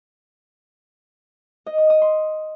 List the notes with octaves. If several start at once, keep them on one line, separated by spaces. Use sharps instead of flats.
D#5
D#6
D#6
C6